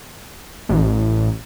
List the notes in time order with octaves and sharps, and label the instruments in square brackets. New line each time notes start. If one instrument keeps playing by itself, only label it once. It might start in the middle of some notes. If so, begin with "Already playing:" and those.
[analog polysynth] A1